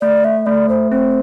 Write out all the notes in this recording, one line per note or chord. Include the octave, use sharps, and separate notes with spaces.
A3 D5
E5
A3 D5
C5
C4 C5